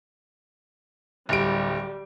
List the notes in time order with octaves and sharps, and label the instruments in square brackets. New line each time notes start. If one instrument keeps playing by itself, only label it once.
[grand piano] D1 D7 [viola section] G3